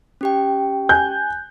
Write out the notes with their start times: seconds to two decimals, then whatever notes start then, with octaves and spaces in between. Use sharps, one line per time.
0.21 C#4 G4 G5
0.89 G#5 F#6 G6